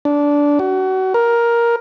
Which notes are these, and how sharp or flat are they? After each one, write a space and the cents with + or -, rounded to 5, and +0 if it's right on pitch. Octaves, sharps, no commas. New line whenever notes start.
D4 -15
F#4 +30
A#4 +10